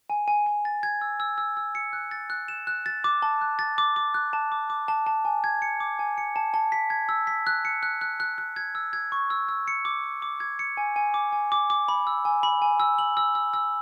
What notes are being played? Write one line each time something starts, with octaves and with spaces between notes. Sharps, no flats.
G#5
G#5
G#5
A6
G#6
E6
E6
E6
E6
C#7
F#6
A6
F#6
E7
F#6
A6
D6
A5
F#6
A6
D6
D6
F#6
A5
D6
D6
A5
A5
G#5
G#6
C#7
D6
G#5
C#7
A5
A5
B6
G#6
E6
B6
F#6
C#7
F#6
F#6
F#6
F#6
G#6
E6
G#6
C#6
E6
E6
C#7
D6
D6
D6
G#6
C#7
G#5
G#5
D6
G#5
D6
D6
B5
E6
G#5
B5
G#5
E6
F#7
E6
E6
E6